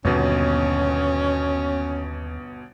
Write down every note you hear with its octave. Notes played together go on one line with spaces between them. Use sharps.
G1 D#2 B2 C#4